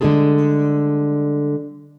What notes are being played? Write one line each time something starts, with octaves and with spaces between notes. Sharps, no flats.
D3 G3 G#3 F4 G#4 A4